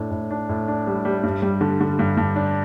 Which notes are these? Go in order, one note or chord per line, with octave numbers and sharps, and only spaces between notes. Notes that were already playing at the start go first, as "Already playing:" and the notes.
Already playing: A2 D4
A2
D4
A2
D4
G3
G3
G2
G3
D3
D3
G2
G2
D4